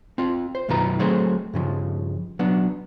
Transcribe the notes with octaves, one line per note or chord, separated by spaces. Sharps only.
C4 F4
C5
B1 F#2 D#3 F4 B4 A#5
F#3 A3 C4 G#4 C5
G2 C#3 F3
F#3 B3 D4